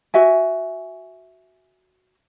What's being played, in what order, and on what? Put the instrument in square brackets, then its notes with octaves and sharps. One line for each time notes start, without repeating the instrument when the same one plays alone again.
[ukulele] F#4 E5 G#5